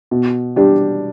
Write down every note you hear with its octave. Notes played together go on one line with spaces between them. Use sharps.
B2
G3 D4 G4